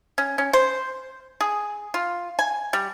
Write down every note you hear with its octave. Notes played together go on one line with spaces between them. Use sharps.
C#4
C#4
C5
G#4
F4
G#5
G3